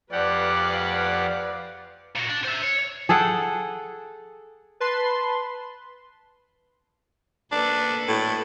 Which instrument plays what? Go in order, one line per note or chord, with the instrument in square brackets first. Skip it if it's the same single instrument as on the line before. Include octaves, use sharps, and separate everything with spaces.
[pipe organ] F2 G4 F#5 [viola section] B4 D5 F5
[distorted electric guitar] A#2 F#4
D4
C5 E5
C#5
[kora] G#4 A4 F#5 G5
[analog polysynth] B4 A5 C6
[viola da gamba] A#3 A4 B4 [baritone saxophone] D4
[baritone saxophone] A2